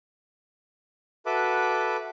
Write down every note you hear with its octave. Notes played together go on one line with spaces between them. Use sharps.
F#4 A4 B4 E5 B5 D6